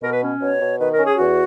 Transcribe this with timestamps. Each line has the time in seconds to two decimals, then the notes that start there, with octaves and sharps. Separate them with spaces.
0.01 B2 A#4
0.12 B4
0.21 C#4
0.40 B2 C#5
0.60 B2
0.78 D#3 B4
0.92 A#4
0.98 C#4
1.04 G#4
1.17 E2 F#4